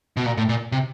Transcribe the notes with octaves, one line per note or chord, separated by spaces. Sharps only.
B2
A#2
A2
A#2
C3